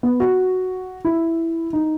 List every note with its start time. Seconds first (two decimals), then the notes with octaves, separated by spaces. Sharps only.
0.03 B3
0.20 F#4
1.05 E4
1.73 D#4